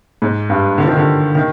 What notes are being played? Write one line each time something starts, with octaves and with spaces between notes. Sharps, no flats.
G#2
G2
D3
F3
D#3
D3
D#3